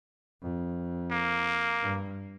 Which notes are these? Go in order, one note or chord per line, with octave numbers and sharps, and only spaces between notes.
F2
A#3
G2